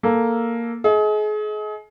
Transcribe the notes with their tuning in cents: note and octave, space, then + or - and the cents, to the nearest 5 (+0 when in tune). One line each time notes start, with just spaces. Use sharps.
A#3 +0 A4 +0
G#4 +35 D#5 +35